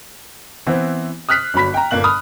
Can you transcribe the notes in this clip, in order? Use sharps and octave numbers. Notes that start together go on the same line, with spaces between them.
E3 B3 C4 E4
D#6 F6 F#6 B6 C7
G1 F#3 B5 B6
G5 A#5
G1 A#2 A#3 F#6 F#7
B5 D#6 F6